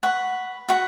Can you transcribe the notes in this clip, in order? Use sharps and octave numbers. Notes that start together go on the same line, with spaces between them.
B4 F#5 C#6
F#4 B4 F#5 C#6